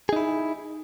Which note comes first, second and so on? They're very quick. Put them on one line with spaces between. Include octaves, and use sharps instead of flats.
G#4 D#4 E4